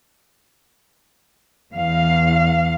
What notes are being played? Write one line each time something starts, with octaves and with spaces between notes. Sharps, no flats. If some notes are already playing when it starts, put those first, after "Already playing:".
E2 F5